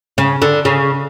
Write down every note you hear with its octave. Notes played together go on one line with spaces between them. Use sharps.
C#3
D3
C#3